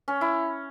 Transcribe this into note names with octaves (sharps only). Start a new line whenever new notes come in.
C#4
E4